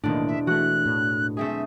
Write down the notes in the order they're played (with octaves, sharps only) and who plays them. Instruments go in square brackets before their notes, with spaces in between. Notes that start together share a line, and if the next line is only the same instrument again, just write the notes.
[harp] E1 D4 [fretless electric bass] A2 D#3 A#3
[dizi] E5
[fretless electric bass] E3 A3 [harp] F#4 [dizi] F#6
[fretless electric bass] A2
[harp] A3 C4 G#4 [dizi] E5